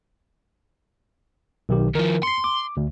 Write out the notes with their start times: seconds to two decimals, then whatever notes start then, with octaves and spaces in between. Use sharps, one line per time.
1.69 B1 D#3 G4
1.95 D#3 F3 A#4
2.23 C6 C7 C#7
2.44 D6
2.77 D2